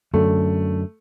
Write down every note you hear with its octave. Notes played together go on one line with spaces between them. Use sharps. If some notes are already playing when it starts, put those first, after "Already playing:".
F#2 D3 A3